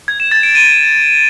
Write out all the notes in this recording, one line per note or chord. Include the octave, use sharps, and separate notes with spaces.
G#6
E7
A6
D7
D#7